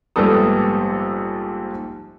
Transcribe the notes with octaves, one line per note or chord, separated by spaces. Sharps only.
A#1 G#2 G3 B3 A4 D#6